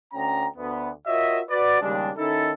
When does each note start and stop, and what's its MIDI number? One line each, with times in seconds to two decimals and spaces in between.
0.13 0.46 38
0.13 0.46 61
0.13 0.46 79
0.13 0.46 82
0.57 0.89 38
0.57 0.89 59
1.07 1.41 65
1.07 1.41 66
1.07 1.41 70
1.07 1.41 73
1.07 1.41 75
1.07 1.41 76
1.49 1.81 66
1.49 1.81 71
1.49 1.81 74
1.81 2.10 39
1.81 2.10 49
1.81 2.10 55
1.81 2.10 56
1.81 2.10 62
2.17 2.52 51
2.17 2.52 61
2.17 2.52 63
2.17 2.52 64
2.17 2.52 69